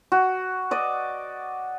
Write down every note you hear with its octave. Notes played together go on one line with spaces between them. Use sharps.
F#4
D5 D#5